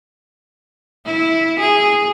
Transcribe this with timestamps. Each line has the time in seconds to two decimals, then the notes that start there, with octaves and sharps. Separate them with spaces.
1.06 E4
1.60 G#4